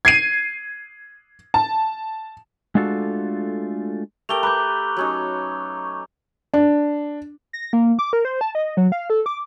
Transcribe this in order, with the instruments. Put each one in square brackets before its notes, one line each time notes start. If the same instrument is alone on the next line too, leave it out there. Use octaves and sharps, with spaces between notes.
[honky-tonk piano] G#6 C7 D#7
A5
[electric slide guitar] G#3 A3 D4 F4 F#4 A4
[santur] A3 G4 A#4 [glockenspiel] F7 G7
[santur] B4 [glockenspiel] A#5 D6 G6
[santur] F#3 C#4 D#4
[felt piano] D4
[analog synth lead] A#6
A#3
D6
A#4
C5
A5
D#5
F#3
F5
A4
D6